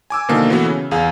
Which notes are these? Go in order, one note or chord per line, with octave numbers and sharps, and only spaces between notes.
G#5 D6 E6
B2 D3 D#3 F3 A#3
E3 A3 B3 F#4
C#3
E2 G#4 F5